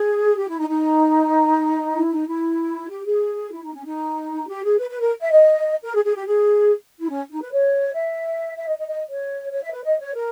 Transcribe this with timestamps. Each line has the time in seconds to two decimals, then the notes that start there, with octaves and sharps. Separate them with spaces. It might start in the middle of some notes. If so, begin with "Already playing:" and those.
Already playing: G#4
0.38 G4
0.48 E4
0.59 D#4
0.69 D#4
1.95 E4
2.11 D#4
2.27 E4
2.89 G4
3.05 G#4
3.53 E4
3.63 D#4
3.74 C#4
3.84 D#4
4.48 G4
4.63 G#4
4.79 B4
4.89 B4
5.00 A#4
5.21 E5
5.31 D#5
5.84 A#4
5.95 G#4
6.05 G#4
6.15 G4
6.26 G#4
6.99 E4
7.10 C#4
7.31 D#4
7.41 B4
7.52 C#5
7.94 E5
8.57 E5
8.68 D#5
8.78 D#5
8.88 D#5
9.10 C#5
9.52 C#5
9.62 E5
9.73 B4
9.83 D#5
9.99 C#5
10.15 A#4